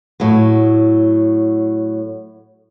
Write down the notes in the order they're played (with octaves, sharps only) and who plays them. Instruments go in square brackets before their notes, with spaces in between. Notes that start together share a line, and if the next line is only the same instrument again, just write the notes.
[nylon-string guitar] A2 F#3